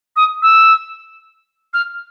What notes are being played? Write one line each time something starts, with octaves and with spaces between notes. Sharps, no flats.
D#6
E6
F6